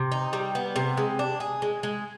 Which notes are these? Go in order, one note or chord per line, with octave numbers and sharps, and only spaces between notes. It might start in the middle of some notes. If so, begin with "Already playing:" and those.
Already playing: C3
D#4
G3
B3
C3
G#3
D4
G#4
G#3
G#3